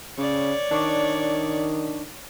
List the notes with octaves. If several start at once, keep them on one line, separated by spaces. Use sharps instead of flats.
C#3 C#5 D5
D#3 D4 C#6 D6